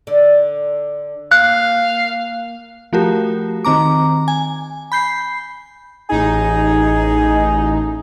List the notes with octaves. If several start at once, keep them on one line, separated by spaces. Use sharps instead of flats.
D3 D5
A#3 F5 F#6
F3 A3 F#4 G4 A#4
D#3 C4 A#5 D6
G#5
B5 G6 C7
A1 D#4 G#4